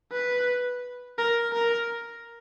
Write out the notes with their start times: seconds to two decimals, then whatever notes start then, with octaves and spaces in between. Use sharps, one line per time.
0.13 B4
1.18 A#4
1.53 A#4